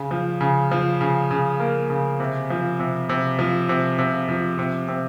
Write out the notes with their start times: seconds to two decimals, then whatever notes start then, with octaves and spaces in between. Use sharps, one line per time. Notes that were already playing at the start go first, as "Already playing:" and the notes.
Already playing: C#3
0.11 F3
0.41 C#3
0.71 F3
1.01 C#3
1.31 C#3
1.60 A#3
1.90 C#3
2.20 C3
2.50 F3
2.80 C3
3.09 C3
3.39 F3
3.69 C3
3.99 C3
4.29 F3
4.59 C3
4.88 C3